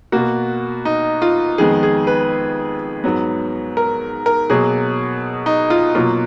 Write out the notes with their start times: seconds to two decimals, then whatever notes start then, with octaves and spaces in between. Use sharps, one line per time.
0.12 B2 A#3 F#4
0.85 D#4
1.22 F4
1.58 F2 D#3 G#3 B3 G#4
1.83 G#4
2.07 B4
3.04 G#2 F#3 B3
3.77 A#4
4.26 A#4
4.50 B2 F#3 A#3 G#4
5.46 D#4
5.70 F4
5.95 B2 F#3 A#3 F4